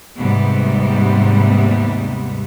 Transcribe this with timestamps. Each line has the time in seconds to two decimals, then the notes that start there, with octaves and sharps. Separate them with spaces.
0.17 D#2 G#2 C3 G3 B3